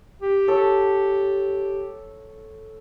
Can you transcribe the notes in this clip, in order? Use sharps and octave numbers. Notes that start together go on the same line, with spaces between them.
G4
A4 C#5